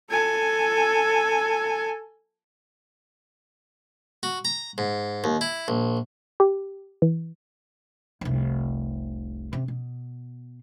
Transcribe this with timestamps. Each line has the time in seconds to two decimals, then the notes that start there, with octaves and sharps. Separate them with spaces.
0.11 A4 G#5
4.23 F#4
4.45 A#5
4.78 G#2
5.24 D#2
5.41 E4
5.68 A#1
6.40 G4
7.02 E3
8.21 F1 C2
9.53 C3
9.68 B2